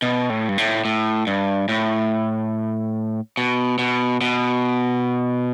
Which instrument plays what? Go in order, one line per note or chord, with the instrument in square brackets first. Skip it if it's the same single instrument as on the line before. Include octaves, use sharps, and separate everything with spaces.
[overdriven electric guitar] B2
A2
G2
A2
A2
G2
A2
B2
B2
B2